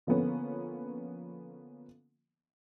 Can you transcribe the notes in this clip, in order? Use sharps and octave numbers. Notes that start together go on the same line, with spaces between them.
D3 F3 A#3 B3 C#4